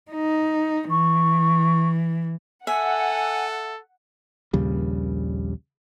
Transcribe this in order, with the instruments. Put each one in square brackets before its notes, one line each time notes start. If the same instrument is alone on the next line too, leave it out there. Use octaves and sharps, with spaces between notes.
[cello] D#4
[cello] E3 [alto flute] C#6
[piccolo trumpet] A4 [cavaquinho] E5 [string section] F#5 [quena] G#5
[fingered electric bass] A#1 D#2 C#3 G3